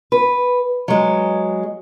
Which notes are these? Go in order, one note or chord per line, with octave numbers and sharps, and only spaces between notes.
B4
F#3 G#3